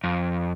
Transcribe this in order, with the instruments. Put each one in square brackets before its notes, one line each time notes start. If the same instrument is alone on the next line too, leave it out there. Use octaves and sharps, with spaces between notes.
[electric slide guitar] F2